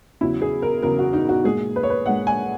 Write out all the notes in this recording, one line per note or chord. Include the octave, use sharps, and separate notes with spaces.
E2 C#3 F#3 E4
G#4
A#4
E2 C#3 F#3 A#4
F#4
D#4
F#4
A#2 G#3 G#4
B4
C#5
B4
A#2 G#3 F#5
G#5